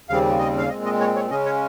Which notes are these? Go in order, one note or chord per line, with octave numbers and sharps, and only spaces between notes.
D#2 C#3 G3 C4 F5
D#5
F5
A#2 G#3 C4 D#5
D#5
C#5
C#5
C#3 G#3 C#4 D#5
C#5